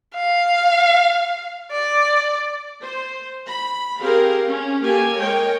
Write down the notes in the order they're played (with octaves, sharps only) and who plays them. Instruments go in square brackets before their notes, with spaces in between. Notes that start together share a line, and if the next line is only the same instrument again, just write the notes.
[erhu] F5
D5
[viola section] C5
B5
C4 G4 G#4 A#4 F5
C#4
A#3 G4 A4 G#5
G#3 A#4 C#5 G5